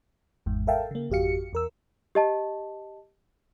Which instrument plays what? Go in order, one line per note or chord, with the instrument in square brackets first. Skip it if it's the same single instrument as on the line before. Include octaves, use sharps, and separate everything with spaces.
[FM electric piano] G#1 E2 G#2
A4 A#4 E5 F5 G5 A5
C#3 A#3
G#1 F2 F#4 G4 F5 C#7
E2 A#4 E6
[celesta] G4 D#5 A5